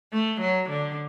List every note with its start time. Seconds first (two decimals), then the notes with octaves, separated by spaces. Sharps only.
0.13 A3
0.41 F#3
0.69 D3